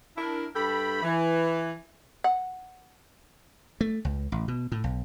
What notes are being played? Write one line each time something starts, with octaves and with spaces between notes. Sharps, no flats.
D4 E4 A#4
G2 D4 A4 G5 B5
E3
F#5
A3
C#2
A1
B2
A2
B1